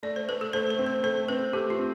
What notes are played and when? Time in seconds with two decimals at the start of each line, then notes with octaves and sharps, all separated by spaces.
0.03 A3 D5
0.16 C5
0.29 A3 B4
0.41 A4
0.53 A3 C5
0.70 C5
0.79 C4
0.86 C5
1.03 A3 C5
1.28 C4 B4
1.53 A3 G4
1.70 F4
1.79 C4